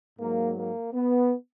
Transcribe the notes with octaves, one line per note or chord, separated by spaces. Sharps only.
G#2 F#3 A#3
A#3
B3